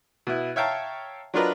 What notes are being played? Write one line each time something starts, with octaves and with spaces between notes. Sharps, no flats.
B2 E4
C#5 E5 F5 G5 A5 A#5
F#3 D4 F4 A#4 B4 D#5